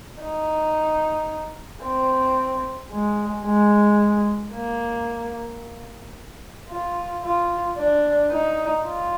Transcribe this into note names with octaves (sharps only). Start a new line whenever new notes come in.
D#4
C4
G#3
G#3
A#3
F4
F4
D4
D#4
F4